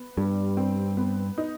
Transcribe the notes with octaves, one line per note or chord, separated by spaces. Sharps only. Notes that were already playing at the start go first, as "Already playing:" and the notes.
Already playing: B3
G2 G3
C4
B3
D#4